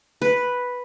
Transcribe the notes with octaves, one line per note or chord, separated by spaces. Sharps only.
B4